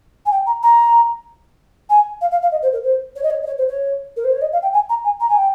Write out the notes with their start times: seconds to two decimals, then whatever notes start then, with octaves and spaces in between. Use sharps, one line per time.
0.26 G#5
0.31 G5
0.46 A#5
0.63 A#5
1.89 G#5
2.21 F5
2.31 F5
2.42 F5
2.52 D#5
2.62 C5
2.73 A#4
2.83 C5
3.16 C#5
3.23 D#5
3.30 C#5
3.42 D#5
3.46 C#5
3.58 C5
3.68 C#5
4.17 A#4
4.24 C5
4.33 C#5
4.42 D#5
4.53 F5
4.62 G5
4.73 G#5
4.89 A#5
5.04 G#5
5.20 A#5
5.29 G#5
5.37 G5